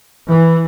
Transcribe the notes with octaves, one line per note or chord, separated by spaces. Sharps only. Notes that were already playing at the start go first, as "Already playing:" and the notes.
E3